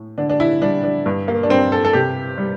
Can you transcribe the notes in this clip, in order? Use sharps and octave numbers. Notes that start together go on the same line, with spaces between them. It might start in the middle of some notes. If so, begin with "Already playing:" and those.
Already playing: A2
D3 D4
D4
E4
G3 D4
D4
G2
A#3
D4
G2 C4
A4
A4
C3 G4
G3